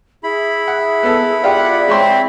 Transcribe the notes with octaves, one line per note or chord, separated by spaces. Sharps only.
E4 G#4 B5
F#5
B3 A4
F4 G4 G#4 D5 F5 F#5
G#3 C4 C#5 C6